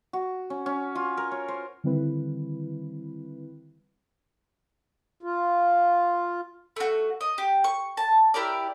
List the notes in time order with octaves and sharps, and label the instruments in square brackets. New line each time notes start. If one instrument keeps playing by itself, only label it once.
[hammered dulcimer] F#4
C#4
C#4
F4
A#4
C#5
C5
[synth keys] D3 D#3 G3 C4 E4 B4
[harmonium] F4
[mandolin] A3 F#4
D#5
G4
C#6
A5
E4 G4 A#4 D5